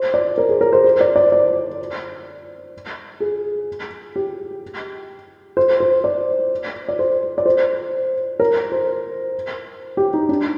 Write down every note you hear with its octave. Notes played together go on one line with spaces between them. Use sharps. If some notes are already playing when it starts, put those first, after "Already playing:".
Already playing: C5
D5
A#4
G#4
A#4
C5
C5
D5
D5
D5
G#4
G4
C5
C5
D5
D5
C5
D5
C5
A#4
C5
G4
D#4
D4